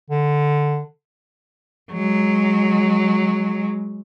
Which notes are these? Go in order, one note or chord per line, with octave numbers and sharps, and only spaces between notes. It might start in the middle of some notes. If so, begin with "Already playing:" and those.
D3
F#3 G#3